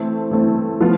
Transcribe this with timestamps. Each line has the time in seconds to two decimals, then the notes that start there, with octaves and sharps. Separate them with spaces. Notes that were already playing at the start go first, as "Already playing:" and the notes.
Already playing: E3 A3 C4
0.31 E3 A3 C4
0.81 F3 B3 F4